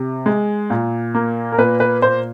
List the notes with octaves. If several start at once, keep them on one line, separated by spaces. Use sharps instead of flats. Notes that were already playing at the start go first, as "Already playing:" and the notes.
Already playing: C3
G#3
A#2
A#3
A#4
A#2 B4
B4
A#2 C5